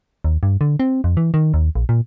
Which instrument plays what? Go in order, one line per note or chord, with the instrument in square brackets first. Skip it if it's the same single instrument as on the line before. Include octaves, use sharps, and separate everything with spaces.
[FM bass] D#2
G2
D3
C4
F2
E3
D#3
D#2
A#1
A#2